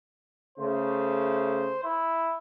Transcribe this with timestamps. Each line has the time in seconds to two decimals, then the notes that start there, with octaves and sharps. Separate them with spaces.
0.58 C#3 A3 C5
1.84 E4